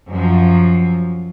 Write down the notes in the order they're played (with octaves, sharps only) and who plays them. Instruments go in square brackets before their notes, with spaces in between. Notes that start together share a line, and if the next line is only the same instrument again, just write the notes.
[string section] F#2 F3